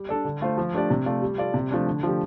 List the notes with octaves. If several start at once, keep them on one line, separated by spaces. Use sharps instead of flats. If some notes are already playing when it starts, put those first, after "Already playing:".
Already playing: G3
D4 A4 D5
D3
A3 F4 C5
F3
A3 D4 G4 D5
C3
A3 F4 D5
G3
F4 A4 D5
C3
F3 A3 D4
D3
F3 A3 D4 G4